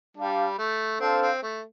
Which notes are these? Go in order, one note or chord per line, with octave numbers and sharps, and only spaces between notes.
G3 D4 G4 F5
A3
C4 D4 A4 C5 F5
C4
A3